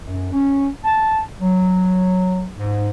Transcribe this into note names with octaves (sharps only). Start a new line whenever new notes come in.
F#2
C#4
A5
F#3
G#2